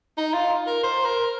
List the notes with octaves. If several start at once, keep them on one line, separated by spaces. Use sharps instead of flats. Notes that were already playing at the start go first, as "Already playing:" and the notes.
D#4
F4
A#4
C5
A#4